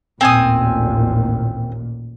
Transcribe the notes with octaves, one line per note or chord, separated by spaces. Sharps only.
A1 D#2 A#2 C4 G#5 D#6